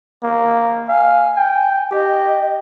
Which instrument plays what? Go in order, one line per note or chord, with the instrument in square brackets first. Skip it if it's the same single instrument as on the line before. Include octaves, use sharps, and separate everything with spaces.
[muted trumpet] A#3
[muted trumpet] F5 [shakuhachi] G#5
[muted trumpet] G5
[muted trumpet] G4 [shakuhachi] D#5